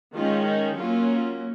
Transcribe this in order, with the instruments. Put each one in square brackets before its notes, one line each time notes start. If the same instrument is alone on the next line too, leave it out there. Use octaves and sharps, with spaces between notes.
[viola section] D#3 G#3 C#4 F4
D#4
F#3 A#3 C#4 F4